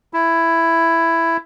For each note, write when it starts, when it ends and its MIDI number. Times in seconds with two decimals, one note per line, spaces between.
0.13 1.37 64